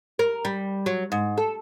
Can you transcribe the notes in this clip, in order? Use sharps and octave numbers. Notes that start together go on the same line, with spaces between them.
A#4
G3
F#3
G#2
A4